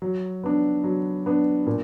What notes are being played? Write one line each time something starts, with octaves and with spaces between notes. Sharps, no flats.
F#3
B3 D4
F#3
B3 D4
A#2